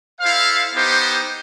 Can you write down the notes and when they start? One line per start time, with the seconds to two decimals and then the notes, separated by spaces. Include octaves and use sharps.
0.20 E4 A4 C5 F5
0.74 B3 D#4 G4 C5